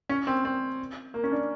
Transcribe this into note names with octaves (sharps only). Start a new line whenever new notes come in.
C#4
C4
C4
A#3
C#4
D4